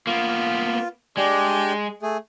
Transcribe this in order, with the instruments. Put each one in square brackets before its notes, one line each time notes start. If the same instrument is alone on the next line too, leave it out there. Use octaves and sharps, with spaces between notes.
[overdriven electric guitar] A#3 B3 [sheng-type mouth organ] F4
[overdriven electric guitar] G#3 [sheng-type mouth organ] D4 G4 D5
[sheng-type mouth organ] A3 G#4